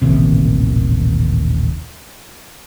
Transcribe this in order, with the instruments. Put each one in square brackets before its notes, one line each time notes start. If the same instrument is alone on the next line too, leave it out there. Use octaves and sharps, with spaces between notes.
[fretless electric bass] D#1 A1 D#2 C3